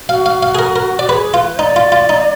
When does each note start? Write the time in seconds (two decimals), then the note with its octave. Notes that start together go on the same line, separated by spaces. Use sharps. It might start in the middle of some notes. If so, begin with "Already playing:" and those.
0.09 F#4 F5
0.26 F5
0.43 F5
0.55 G#4
0.59 A#4
0.76 A#4
0.99 D5
1.09 G#4 B4
1.34 F4 B4
1.59 D#4 D5
1.76 F4
1.92 F4
2.09 D#4